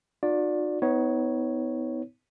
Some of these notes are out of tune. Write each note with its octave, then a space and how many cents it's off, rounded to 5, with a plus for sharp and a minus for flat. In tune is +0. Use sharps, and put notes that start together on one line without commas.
D#4 -40 F#4 -45 D5 +0
B3 +25 D#4 +40 C#5 +0